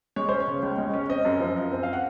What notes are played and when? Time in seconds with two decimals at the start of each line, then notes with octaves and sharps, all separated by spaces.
0.16 G#3 C#5
0.29 C#4 C5
0.40 C#5
0.47 C#3
0.63 C#2
0.78 G#3
0.94 C#4
1.09 C4 D#5
1.25 F#2
1.40 F3
1.56 F#2
1.72 C4
1.83 F5
1.93 F#5